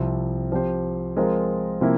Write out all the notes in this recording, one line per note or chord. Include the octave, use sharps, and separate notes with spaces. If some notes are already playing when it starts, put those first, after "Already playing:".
Already playing: C2 C3 F3 C4
F3 C4 G4 C5
F3 G#3 C4 F4 A#4
C3 F3 A#3 E4